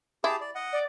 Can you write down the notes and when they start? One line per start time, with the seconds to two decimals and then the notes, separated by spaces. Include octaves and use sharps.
0.24 E4 G4 G#4 A5
0.41 D5
0.55 D#5 F#5
0.72 D5